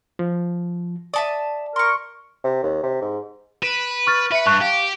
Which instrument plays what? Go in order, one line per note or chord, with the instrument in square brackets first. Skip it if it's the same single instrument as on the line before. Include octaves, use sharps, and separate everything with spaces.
[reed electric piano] F3
[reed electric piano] D5 [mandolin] E5 A5 D#6
[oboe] A#4 [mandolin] C6 C#6
[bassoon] C3
D#2
C3
G#2
[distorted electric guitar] B4 [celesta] D7 E7
[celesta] C#6 F6 A6
[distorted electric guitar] B4 [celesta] E5 C#7
[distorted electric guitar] G2 [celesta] A5 C#6 F#6
[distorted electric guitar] G4 [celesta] F5